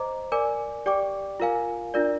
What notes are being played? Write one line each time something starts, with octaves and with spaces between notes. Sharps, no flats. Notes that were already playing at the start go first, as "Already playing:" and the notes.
Already playing: C5 D#5 A#5 D6
A#4 D5 G#5 D6
G4 D5 G5 D6
F4 A#4 F5 G#5
D4 F4 A#4 D5